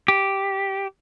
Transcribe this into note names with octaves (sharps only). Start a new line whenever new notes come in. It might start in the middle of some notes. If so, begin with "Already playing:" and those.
G4